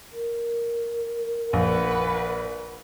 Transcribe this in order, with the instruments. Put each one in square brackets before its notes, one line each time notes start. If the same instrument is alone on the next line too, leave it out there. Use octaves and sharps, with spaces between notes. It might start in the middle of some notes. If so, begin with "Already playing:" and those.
[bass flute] A#4
[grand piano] A#1 [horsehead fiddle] B4 F#5